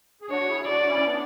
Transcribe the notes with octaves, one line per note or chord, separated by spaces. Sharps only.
G#4
D4 F#4 C#5
E4 G#4
D4 F#4 D5
C#4 E4
B3 D4